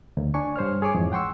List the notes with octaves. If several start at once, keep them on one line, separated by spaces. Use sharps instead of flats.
D2
D4 G#5 C#6
G2 C5 C#5 F6
G#4 C#5 G#5 D6
F2 G#2 E3
F#5 G5 C6 C#6 E6